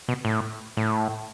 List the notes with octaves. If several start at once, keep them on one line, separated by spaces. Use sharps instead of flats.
B2
A2
A2